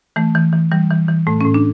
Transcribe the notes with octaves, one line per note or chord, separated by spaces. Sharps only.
E3 A3
E3
E3
E3 G3
E3
E3
A2 A3
C#4
A2
D4